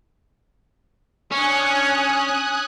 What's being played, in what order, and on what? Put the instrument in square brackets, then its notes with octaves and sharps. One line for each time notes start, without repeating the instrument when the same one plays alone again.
[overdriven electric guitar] C#4 [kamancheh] D4 C#5 [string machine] G#5 D#6 F#6